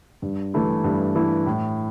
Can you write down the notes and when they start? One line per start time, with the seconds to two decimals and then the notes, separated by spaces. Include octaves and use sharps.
0.22 G2
0.54 E3 A3 E4
0.84 G2
1.15 E3 A3 E4
1.47 A2